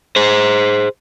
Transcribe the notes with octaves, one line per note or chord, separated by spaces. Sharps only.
G#4 C5